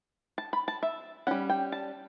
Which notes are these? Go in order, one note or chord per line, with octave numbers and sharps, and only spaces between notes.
A5
B5
A5
E5
G3 C#4 F#5
G5
A5